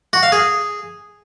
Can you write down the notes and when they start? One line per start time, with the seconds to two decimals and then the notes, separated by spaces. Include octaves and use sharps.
0.13 F#4
0.23 F5
0.32 G#4